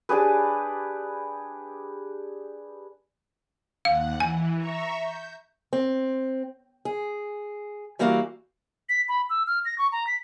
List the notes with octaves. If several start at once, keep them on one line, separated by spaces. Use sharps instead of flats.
D4 G4 G#4 B4
D#2 F5 F#5
E3 G#5
E5 A#5 C#6
G6
C4
G#4
E3 G3 A#3 E4 F#4 F5
B6
B5
E6
F6
A#6
C#6
A#5
B6